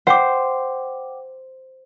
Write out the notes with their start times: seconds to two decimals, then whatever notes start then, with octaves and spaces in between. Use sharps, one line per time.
0.07 C5 F#5 G5 D6